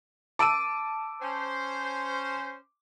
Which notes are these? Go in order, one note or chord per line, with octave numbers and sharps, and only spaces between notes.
A5 D6 E6 D7 D#7
C#4 C5